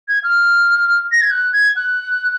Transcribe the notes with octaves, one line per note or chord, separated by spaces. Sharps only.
G#6
F6
A#6
G#6
F#6
G#6
F#6